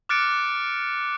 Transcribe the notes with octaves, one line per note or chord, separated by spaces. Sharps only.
D6 F6 F#6 A6 C#7 D7